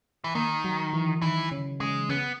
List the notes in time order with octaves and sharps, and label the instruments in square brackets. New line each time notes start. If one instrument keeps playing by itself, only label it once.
[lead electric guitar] E3
[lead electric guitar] D#3 [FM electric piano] A#3
[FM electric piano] F#3
E3
[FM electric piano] D#3 [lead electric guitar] E3
[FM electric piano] C#3
[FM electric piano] C#3 [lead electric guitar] G#3
[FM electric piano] C#3 [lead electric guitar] B3